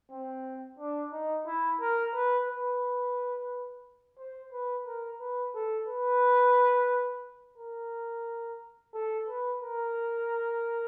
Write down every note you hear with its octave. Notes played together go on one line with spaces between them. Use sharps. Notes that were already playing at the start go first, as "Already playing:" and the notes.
C4
D4
D#4
E4
A#4
B4
B4
C5
B4
A#4
B4
A4
B4
A#4
A4
B4
A#4